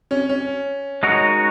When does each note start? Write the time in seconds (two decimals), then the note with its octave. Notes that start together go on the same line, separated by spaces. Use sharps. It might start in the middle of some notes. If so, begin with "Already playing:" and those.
0.11 C#4
0.29 C#4
1.03 G#3 D#4 F#4 A#4 C#5